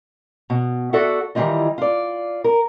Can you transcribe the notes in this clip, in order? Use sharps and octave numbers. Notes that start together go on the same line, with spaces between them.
B2
F#4 A4 D5 E5 F#5
D#3 E3 G3 A#3 F4 D#5
F4 D5
A#4